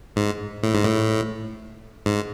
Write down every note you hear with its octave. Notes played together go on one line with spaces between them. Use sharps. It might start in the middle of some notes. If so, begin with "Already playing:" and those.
G#2
A2
G#2
A2
G#2